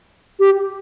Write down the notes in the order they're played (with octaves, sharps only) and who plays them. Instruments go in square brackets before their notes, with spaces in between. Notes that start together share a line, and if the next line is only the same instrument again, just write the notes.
[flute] G4